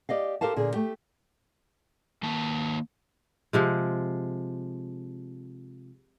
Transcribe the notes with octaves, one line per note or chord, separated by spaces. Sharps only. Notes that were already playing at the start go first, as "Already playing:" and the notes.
G4 D5 D#5 F5
G4 A4 A#4 C5 F5 A5
A#2 D3 G#4
A3 G4
D#3 A#3 A5
C3 F3 G#3